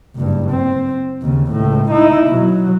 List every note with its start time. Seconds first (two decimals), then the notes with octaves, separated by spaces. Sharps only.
0.16 F#1 G2
0.50 C4
1.22 D#2 C#3
1.51 C#2 A2
1.91 D#4 E4
2.28 B2 F#3